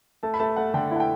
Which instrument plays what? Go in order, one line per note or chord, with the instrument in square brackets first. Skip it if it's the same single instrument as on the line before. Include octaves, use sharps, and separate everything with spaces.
[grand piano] A3 [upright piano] A5
[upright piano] B5
[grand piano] A3 [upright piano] A5
[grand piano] A3 [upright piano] F#5
[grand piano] D3 [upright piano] G5
[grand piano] E4 [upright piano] F#5
[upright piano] G5